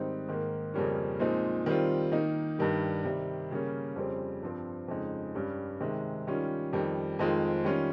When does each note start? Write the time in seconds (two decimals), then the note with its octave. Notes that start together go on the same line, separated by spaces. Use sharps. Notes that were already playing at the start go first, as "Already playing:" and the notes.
Already playing: G#2 D#3 G3 C4 D#4
0.28 G#2 D#3 A#3
0.74 F2 C#3 G3 A#3 C#4
1.19 A#2 F3 G#3 C4 D#4
1.66 D#3 G3 C4 F4
2.12 D#3 A#3 D#4
2.59 G2 D#3 G3
3.04 C3 D#3 G3
3.51 C#3 G3 A#3 C#4
3.96 F2 C#3 G3 C4
4.43 G2 F3 C4
4.88 F2 C#3 G#3 D#4
5.35 G2 G3 C#4
5.80 C3 D#3 G#3
6.27 D#3 G3 C#4 F4
6.73 F2 D#3 G3
7.19 F2 D#3 G#3 C4 F4
7.64 D#3 G3 C#4 F4